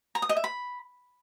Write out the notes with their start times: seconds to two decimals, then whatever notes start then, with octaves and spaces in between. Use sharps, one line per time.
0.15 A#5
0.22 D#6
0.29 D#5
0.37 E5
0.44 B5